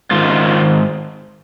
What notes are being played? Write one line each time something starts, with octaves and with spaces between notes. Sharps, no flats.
G#2 D#3 F4